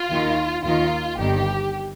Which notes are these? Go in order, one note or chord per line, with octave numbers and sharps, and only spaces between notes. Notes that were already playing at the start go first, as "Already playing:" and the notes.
Already playing: F4
D#2 D#3
D#2 D#3 F4
G1 G2 D#3 G4